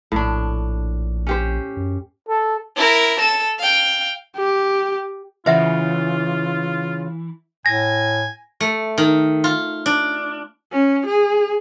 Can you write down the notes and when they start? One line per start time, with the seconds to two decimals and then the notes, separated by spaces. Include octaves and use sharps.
0.12 A#1 A2 D4
1.27 C#4 G4 C5
1.77 F#2
2.29 A4
2.76 E4 A#4
3.19 A4 E7
3.59 F5 G5
4.37 G4
5.46 C#3 E3 F4 C5 E5 F#5
7.66 A2 G#5 A#6
8.60 A3
8.98 D#3
9.44 F4
9.86 D4
10.72 C#4
11.06 G#4